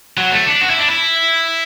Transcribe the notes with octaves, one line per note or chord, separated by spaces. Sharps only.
F#3
A3
D4
F#4
E4
D4
E4